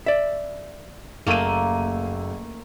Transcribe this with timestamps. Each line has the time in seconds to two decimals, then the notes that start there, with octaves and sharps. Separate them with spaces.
0.06 D5 E5
1.27 F#1 A3 A#3 F5 D#7